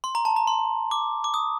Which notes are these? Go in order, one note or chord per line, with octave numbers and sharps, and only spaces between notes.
C6
A#5
A5
A#5
C6
D6
D6
D#6